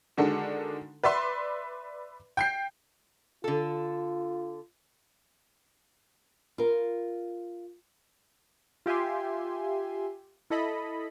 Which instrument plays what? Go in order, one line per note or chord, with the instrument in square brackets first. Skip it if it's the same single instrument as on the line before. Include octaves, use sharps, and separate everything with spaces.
[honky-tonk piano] D3 D#3 G#3 D4 F#4 A4
B4 D5 E5 C6
G5 G6 C7
[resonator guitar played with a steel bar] D3 A4 [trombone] F4
[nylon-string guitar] F4 A#4
[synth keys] F4 G4 E5 G#5 C6
E4 A4 D#5 B5